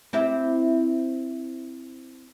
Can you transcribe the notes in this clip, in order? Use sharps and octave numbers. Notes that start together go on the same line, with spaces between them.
C4 E4 G4